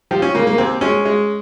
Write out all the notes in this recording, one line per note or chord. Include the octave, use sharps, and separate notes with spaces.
F3 G4
C#4
C#3 A#3
A#3
D#2 C4
G#3 C#4
G#3